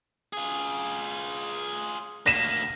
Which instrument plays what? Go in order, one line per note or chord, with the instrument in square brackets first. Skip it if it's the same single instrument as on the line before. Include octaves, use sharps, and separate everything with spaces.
[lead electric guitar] F4 G#4
[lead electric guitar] D2 A#3 [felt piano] A#6 B6 E7